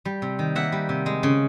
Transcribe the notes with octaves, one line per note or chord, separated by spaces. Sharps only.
G3
C3
D#3
A#3 E5 F#5
G3
C3
G#3
C#3